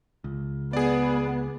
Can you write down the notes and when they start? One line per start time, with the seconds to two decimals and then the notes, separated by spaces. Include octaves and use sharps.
0.24 C#2
0.73 B3 G#4 D5